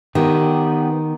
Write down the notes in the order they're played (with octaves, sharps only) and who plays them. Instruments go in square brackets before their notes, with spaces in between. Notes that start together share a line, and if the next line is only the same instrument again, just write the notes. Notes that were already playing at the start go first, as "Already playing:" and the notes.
[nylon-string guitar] D#3 [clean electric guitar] B3 G4